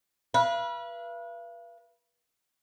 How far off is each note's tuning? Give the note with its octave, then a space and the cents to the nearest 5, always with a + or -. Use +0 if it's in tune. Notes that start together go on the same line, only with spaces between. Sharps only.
B4 -30 F5 -40